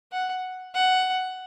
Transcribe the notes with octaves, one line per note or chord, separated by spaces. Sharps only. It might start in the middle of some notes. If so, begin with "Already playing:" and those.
F#5
F#5